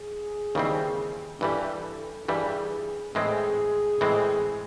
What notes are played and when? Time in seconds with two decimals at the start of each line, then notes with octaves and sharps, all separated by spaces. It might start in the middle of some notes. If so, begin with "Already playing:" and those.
Already playing: G#4
0.55 D#2 C#3 E3 G3 C4
1.41 G2 E3 G3 A4
2.28 G2 E3 G3 G#4
3.15 A2 E3 G#3 C4 G#4
4.01 A2 E3 G#3 C4